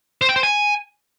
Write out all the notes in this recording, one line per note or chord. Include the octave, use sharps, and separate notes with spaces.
C5
G5
C5
G#5